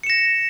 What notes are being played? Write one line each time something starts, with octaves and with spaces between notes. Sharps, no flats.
A#6 C#7 E7